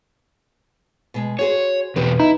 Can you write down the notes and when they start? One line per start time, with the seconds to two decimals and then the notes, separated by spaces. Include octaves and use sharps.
1.14 B2 G#3
1.39 F#4 G#4 C5 C#5
1.96 E2 B2 G4 B4
2.20 D#4 E4